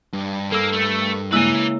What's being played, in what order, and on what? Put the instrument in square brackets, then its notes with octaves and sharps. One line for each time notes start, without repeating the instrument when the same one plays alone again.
[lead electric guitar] G2
[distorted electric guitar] A#3 [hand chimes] A4 E6
[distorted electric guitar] A3 [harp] A#4
[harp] C#3 G#3 A#3 [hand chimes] E4 E6 [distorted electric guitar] B4 G#5